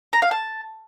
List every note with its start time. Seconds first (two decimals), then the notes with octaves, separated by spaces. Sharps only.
0.13 A#5
0.22 F5
0.31 A5